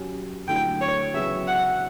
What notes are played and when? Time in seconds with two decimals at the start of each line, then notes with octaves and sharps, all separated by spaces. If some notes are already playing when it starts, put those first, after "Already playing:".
Already playing: F#3 C#4 G4
0.48 D3 F#3 A3 E4 G5
0.81 C#5
1.14 E2 C#3 F#3 B3 F#4 E5
1.47 F#5